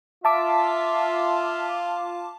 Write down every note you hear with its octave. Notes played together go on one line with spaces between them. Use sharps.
F4 E5 A5 D6